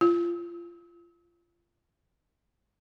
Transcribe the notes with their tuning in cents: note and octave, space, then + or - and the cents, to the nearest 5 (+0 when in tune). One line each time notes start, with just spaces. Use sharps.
F4 -25